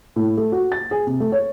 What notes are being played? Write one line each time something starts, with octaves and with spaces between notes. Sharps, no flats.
A2
A3
F#4
A6
G#4
C3
A3
C#5